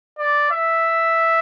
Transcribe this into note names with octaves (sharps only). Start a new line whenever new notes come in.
D5
E5